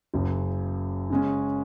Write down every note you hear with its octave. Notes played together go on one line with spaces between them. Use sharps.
F#1 F#2 C#3
C#3 G#3 C#4